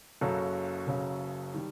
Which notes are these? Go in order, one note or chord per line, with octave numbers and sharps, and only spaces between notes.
F#1 F#2 C#3 F#3 A4
F#1 F#2 C#3 F#3
D#3 G3